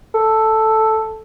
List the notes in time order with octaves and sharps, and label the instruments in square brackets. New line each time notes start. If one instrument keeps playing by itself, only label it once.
[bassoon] A4